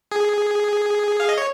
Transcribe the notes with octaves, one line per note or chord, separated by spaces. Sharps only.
G#4
F5
D#5
C#5